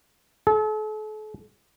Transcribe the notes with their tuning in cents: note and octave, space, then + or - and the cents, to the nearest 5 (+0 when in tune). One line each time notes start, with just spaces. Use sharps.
A4 -40